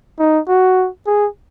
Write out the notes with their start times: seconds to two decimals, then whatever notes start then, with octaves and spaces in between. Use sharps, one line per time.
0.19 D#4
0.48 F#4
1.07 G#4